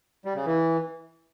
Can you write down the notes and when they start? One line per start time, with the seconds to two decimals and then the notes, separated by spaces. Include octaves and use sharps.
0.25 G3
0.35 C#3
0.46 E3